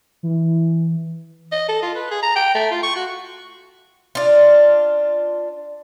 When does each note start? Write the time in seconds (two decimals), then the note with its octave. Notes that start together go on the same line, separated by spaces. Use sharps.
0.23 E3
1.52 D#5
1.68 A4
1.83 F4
1.95 B4
2.11 G#4
2.23 A#5
2.36 G5
2.55 A3
2.71 F4
2.83 C#6
2.96 F#4
4.15 D4 F4